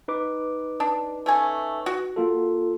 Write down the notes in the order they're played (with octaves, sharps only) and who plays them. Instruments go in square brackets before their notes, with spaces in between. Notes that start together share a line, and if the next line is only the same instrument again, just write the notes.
[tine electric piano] D#4 B4 D6
[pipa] D4
A3 C#4 G#5
F#4
[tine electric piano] A#3 F4 A4